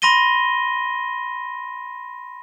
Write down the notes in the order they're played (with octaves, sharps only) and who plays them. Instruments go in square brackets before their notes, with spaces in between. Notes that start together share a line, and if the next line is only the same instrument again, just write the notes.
[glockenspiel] B5 C6 A#6 D#7 G7